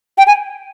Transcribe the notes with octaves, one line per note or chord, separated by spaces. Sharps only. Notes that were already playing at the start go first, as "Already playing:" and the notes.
G5
G#5